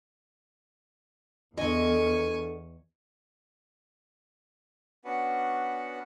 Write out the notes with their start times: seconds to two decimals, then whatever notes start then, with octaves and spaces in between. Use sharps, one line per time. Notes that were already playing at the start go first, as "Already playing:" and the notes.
1.58 E2 D4 F4 A4 D#5 G#5 C#6
5.05 B3 C#4 D4 F#4 B4 F#5